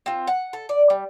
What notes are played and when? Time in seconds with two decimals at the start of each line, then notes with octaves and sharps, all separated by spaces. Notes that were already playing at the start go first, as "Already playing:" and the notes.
0.06 C4 F4
0.27 F#5
0.53 A4
0.69 D5
0.90 G3